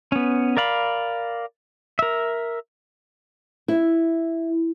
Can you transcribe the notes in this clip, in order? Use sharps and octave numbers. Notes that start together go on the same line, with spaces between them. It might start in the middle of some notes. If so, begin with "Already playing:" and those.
B3 C#4
A#4 D5 F5 B5
A#4 E5
E4